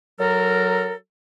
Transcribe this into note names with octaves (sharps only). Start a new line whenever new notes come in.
F#3 A4 A#4